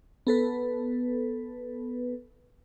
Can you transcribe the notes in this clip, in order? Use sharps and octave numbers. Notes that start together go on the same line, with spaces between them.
B3 A4 B4